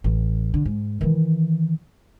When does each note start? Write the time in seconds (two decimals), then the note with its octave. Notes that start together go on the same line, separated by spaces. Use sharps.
0.04 A1
0.54 D3
0.65 G#2
1.01 D#3 E3